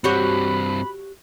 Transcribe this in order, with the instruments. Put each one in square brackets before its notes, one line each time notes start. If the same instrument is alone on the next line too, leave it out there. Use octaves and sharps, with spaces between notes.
[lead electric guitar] G2 C4 [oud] F#4 G4 C#5 [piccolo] B5